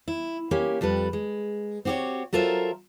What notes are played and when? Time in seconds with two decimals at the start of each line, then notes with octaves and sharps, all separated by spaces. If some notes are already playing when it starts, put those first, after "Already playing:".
0.08 E4
0.51 A#3 C#4 G4 G#5
0.81 F2 G3 A4 B4
1.13 G#3
1.85 C4 F#4 G4 A4 C#5
2.33 F#3 F4 A4 A#4 C5 E5